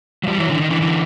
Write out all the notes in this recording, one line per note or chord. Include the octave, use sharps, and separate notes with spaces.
F#3
F3 G3
E3 F#3
D3 E3
D#3
D3 E3
D3 E3